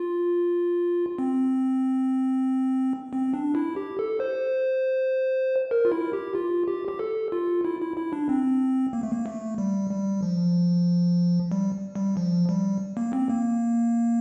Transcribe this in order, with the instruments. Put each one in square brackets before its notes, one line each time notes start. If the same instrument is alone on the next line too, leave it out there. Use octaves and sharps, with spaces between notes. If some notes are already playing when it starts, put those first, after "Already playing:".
Already playing: [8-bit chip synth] F4
C4
C4
D4
E4
G4
A4
C5
A#4
F4
E4
G4
F4
G4
G4
A4
F4
E4
E4
E4
D4
C4
A#3
A3
A#3
A3
G3
G3
F3
G3
G3
F3
G3
A#3
C4
A#3